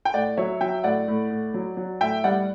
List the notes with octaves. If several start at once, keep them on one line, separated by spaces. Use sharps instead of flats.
G5
A2 D5 F#5
F#3 C#5 E5
F#3 E5 G5
A2 D5 F#5
A2
A2
F#3
F#3
A2 E5 G5
G3 D5 F#5